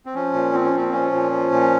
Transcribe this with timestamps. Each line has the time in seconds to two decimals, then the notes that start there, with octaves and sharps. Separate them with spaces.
0.06 C4
0.15 F3 C#4
0.34 A#2
0.53 F3 C4
0.64 C#4
0.73 A#2 C4
0.92 F3 C#4
1.12 A#2
1.32 F3
1.52 A#2